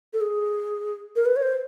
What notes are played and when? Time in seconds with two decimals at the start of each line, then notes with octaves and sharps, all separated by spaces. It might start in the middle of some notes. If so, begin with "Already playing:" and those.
0.13 A4
0.21 G#4
1.16 A#4
1.26 B4
1.36 C#5
1.42 C5